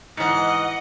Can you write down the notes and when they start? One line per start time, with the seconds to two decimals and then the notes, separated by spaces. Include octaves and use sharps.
0.17 G#2 E3 D#5 F#5 D#6 C#7